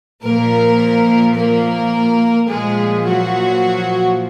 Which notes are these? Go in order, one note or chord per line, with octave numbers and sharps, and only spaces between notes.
A#2 F3 A#3 A#4
A#3 A#4
A#2 F3 G#3 G#4
F#3 F#4